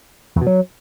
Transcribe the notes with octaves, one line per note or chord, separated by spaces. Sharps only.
E2
B2
F#3